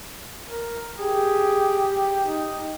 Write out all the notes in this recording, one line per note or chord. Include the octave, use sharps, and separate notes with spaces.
A#4
G4 G#4
D#4